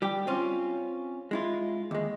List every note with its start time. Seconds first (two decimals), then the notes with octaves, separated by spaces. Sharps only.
0.02 G3 G4
0.27 C4 C#4 F4
1.31 G#3 E4 F4
1.91 D#2 G#3